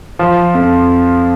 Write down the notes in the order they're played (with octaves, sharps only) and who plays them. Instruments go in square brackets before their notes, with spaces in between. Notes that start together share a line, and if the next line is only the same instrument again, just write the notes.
[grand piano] F3
F2